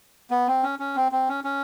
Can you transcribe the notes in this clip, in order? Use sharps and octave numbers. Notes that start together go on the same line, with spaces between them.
B3
C4
C#4
C#4
C4
C4
C#4
C#4